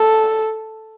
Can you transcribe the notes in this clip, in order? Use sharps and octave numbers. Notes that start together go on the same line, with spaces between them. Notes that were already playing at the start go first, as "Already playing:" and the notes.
Already playing: A4